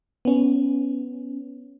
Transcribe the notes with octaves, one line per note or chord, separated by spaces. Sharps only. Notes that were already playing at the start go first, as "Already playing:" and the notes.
B3 C#4